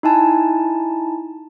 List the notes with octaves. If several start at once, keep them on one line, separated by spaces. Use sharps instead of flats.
D#4 E4 G#5 A5